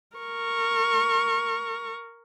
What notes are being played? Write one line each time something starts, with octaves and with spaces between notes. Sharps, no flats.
A#4 C#6